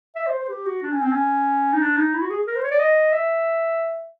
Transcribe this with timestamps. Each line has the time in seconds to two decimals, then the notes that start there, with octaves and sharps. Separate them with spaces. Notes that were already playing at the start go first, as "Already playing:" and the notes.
0.16 E5
0.27 C5
0.39 C5
0.49 G4
0.66 F#4
0.82 D4
0.92 C#4
1.02 C4
1.12 C#4
1.73 D#4
1.81 D4
1.97 D#4
2.14 E4
2.22 F#4
2.30 G#4
2.47 A#4
2.56 C5
2.63 C#5
2.71 D5
2.80 D#5
3.13 E5